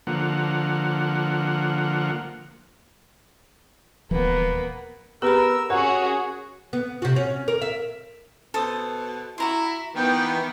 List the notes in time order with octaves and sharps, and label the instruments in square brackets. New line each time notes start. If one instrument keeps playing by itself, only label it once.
[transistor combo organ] D3 F3 A#3 F#5
[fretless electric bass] D#1 E3 F3 [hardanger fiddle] A#3 B3
[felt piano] B3 [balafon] G4 G#4 B5 [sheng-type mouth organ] A#4 E6
[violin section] C#4 F#4 G#4 [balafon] A#4 [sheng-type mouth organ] C#5 [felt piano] F#5
[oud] B3
C3 F#4
C#4
A#4
E5
[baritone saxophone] B2 [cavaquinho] A4 C5 D#6
[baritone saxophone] E4 [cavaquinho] F#4 A#5 C6 [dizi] E5
[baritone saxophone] D#3 [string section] E3 B3 [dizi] G5